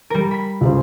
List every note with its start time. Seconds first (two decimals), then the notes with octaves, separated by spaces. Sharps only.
0.10 G3 A#4
0.31 B5 B6
0.61 C#2 G#4 C5